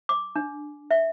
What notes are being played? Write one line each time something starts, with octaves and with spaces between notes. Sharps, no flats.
D6
D4
E5